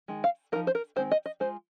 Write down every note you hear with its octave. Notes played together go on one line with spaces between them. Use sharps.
D#3 G#3
F5
F3 A#3 D#4 A#4
C5
A#4
D#3 G#3 C4 C5
D#5
D#5
G#3 F4 C5